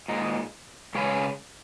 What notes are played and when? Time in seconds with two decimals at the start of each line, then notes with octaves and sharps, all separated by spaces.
0.08 A#2 G#3 D#4
0.95 C#3 G#3 C#4 G#4 B4